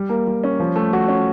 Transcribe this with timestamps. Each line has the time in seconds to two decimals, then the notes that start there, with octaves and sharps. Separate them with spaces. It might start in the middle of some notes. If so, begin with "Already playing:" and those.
Already playing: G3
0.09 A#3
0.27 G3
0.44 C#4
0.60 F3
0.76 A3
0.93 F#4
1.08 C#4